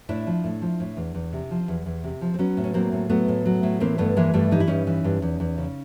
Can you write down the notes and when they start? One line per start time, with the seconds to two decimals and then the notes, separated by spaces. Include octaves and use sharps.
0.09 A2 D4 E4
0.27 F3
0.44 A2
0.62 F3
0.80 A2
0.97 E2
1.15 E2
1.33 C3
1.51 F3
1.68 E2
1.86 E2
2.04 C3
2.21 F3
2.34 C4
2.39 F#3 B3 C#4
2.57 A2
2.64 C#4
2.74 F#3 A#3 C4
2.92 A2
3.10 F#3 A3 B3
3.28 A2
3.46 F#3
3.63 A2
3.80 E3 A#3 C4
3.98 G2 A3 B3
4.17 E3 G#3 A#3
4.34 G2 G3 A3
4.51 E3 D#4
4.60 E4
4.67 G2 C#4 D#4
4.87 E3
5.04 G2
5.22 E2
5.40 E2
5.58 C#3